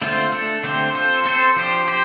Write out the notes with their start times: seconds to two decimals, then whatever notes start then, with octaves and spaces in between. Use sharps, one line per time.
0.02 D3 A3 C4 F4 C5
0.32 A3 D4 A4
0.63 D3 A3 C4 G4 C5
0.94 C4 F4 A4 C5
1.26 C4 A4 C5
1.56 F3 D4 G4 C5
1.88 C4 G4 C5